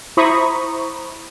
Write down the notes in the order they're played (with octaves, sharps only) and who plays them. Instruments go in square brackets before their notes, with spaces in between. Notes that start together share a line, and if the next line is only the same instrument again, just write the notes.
[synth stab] E4 C5 A#5 B5 C#6 D#6